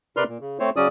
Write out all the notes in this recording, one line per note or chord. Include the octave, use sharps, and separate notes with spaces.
C3 A#4 B4 D5 C6 F6
A#2
C#3
A3 C4 C5 C#5
C#3 F#3 C#4 D5 D#6